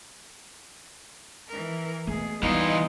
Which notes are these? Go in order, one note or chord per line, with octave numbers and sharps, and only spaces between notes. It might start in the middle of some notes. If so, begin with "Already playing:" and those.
E3 A#4
B2 A3 G#4
E3 G3 B3 D#4 F4 D#5